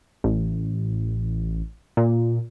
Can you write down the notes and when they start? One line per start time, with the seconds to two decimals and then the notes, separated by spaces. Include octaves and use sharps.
0.24 A1
1.97 A#2